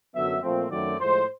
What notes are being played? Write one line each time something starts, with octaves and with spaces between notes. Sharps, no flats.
F#2 D3 F#3 B3 E5
A#2 F3 A3 C4
F#2 D#3 F#3 A3 C4 D5
A2 F3 G#3 C5